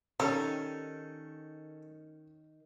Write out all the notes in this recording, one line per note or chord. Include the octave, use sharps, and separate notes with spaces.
D#3 G3 C#4 A4 A#5